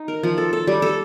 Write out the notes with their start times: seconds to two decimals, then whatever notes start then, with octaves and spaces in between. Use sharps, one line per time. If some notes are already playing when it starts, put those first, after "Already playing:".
Already playing: D#4
0.08 A#4
0.23 F3
0.38 A4
0.53 A4
0.67 G3
0.82 A4